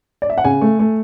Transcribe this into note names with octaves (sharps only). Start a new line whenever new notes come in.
D5
E5
F#5
C#3 G#5
A3
A3